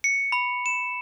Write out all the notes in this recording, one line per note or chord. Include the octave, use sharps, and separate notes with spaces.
C#7
B5
E7